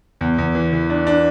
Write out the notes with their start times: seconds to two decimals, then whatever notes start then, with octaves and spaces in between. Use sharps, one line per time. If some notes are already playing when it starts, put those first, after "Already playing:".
0.21 E2
0.38 E2
0.55 E3
0.73 E3
0.90 D4
1.07 D4